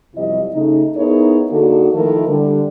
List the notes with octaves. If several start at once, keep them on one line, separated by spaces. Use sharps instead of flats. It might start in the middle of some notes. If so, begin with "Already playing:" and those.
F#2 C3 F3 G3 E4 D#5
C#3 A3 D#4
B3 D#4 E4 G#4 A#4 C#5
D3 A#3 D#4 F#4 G#4 A4
D#3 F3 A3 E4 A4 A#4
D3 G3